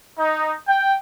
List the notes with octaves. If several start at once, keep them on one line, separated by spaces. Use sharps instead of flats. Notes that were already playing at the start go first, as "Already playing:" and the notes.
D#4
G5